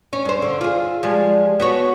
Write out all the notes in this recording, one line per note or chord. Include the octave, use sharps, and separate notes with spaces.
C#4
G2 C5
D3
F4 G#4
F3 G3 G#3
B3 F#4 C#5